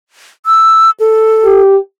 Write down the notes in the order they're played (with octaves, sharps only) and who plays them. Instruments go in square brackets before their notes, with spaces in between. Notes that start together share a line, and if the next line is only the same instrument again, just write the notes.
[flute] E6
A4
[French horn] G4